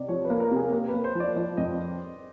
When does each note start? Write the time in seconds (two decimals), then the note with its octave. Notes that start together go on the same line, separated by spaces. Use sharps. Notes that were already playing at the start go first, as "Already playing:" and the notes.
Already playing: C3 D5 D#5
0.08 F3 C#5
0.25 B4
0.30 A#3
0.40 A#4
0.51 C3 G#4
0.73 A#3
0.88 B4
0.94 A#3
1.04 C5
1.15 F3 D5
1.36 F3 D5
1.57 F2 D#5